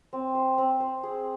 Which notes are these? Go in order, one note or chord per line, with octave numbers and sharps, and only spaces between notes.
C4
C5
C4
C5
G#4